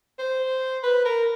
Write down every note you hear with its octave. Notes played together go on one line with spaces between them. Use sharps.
C5
B4
A#4